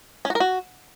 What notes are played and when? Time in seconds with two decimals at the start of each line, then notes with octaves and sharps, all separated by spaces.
0.25 C#4
0.30 F#4
0.35 A#4
0.40 F#4